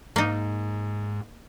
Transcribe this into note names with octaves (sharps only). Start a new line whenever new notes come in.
G#2 A#3 D#4